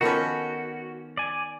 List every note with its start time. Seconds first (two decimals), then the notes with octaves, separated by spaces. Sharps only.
0.01 D#3 F3 A#3 B3 C#4 F#4 A4
1.17 D5 G#5